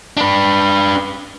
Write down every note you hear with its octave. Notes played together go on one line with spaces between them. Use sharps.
D4 B4